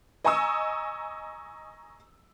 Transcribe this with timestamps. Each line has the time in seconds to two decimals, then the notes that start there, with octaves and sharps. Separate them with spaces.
0.25 D#5 G#5 A#5 C#6 D#6 E6